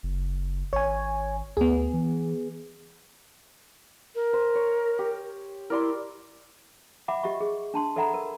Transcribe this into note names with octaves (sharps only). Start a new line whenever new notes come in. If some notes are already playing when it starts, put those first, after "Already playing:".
F#1
G#1 C#5 G#5
D2 B3 G#4
E3
A#4
C5
C#5
G4
E4 A#4 D5 C6
E5 F#5 B5 D6
G4 D#5 E5 C#6
G#4
D4 A5 C6
A4 D5 E5 F#5 A#5 B5
A#4